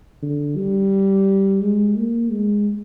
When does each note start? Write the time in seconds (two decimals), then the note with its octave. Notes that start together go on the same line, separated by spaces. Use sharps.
0.22 D3
0.56 G3
1.61 G#3
1.96 A#3
2.31 G#3